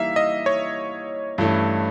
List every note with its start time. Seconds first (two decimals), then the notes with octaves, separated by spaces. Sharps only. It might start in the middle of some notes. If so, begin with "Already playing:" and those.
Already playing: E3 G3 A#3 D#4 E5 F5
0.16 D#5
0.46 C#5
1.38 G2 E3 A3 C#4 E4